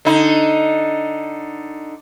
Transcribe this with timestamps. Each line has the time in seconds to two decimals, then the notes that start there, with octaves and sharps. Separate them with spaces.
0.05 D3 D#4